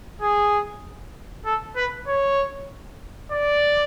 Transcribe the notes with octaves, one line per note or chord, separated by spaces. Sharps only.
G#4
A4
B4
C#5
D5